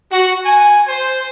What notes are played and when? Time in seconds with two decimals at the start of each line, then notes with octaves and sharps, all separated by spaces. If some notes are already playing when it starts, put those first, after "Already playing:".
0.12 F#4
0.45 G#5
0.88 C5